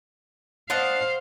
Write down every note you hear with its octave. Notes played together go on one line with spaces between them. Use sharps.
D4 C5 D#5 F5 F#5